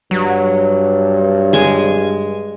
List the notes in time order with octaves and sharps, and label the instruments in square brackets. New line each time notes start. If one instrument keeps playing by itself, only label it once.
[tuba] G2 [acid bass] F#3
[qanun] G#3 G#5